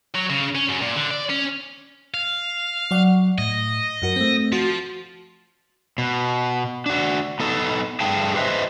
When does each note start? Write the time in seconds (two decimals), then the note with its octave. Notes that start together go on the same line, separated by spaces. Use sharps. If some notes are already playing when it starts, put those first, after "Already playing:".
0.15 F#3
0.30 C#3
0.55 C#4
0.69 F#2
0.82 A#2
0.96 D3
1.11 D5
1.29 C#4
2.14 F5
2.91 F#3 D5 F#5
3.38 A2 D#5
4.02 F#2 F#4 A#4
4.16 A3 C4
4.53 F3 F#4
5.98 B2
6.86 D4 F#4
7.40 B3 D#4 A4
8.00 G2 D3 A3 G#4 G5 A5
8.35 G4 B4 C5 D#5 E5